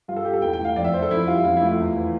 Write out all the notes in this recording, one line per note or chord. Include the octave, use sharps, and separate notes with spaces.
G2 F4
A4
G3 G4
A4
E2 G5
G5
A3
F5
F2 D5
E5
F3 C5
A4
F2 E4
G3 F4
F2 F4
A3 E4
F4
E2
E3